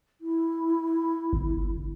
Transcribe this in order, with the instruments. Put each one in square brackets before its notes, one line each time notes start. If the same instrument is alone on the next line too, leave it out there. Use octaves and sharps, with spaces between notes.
[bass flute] E4
[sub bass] G1